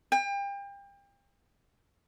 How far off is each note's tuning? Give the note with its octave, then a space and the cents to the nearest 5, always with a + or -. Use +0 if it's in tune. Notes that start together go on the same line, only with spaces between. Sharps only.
G5 +35